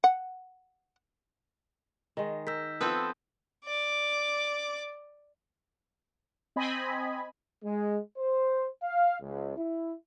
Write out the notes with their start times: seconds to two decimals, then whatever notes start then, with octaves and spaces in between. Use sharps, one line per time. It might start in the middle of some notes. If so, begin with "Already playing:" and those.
0.04 F#5
2.17 D#3 G#3
2.47 A#4 E6 G6 B6
2.81 F3 B3 C4 A4 B4 D#6 E6 G6
3.65 D5 D6
6.56 C4 D#5 G#5 B5
7.63 G#3
8.17 C5
8.83 F5
9.21 C#2
9.57 E4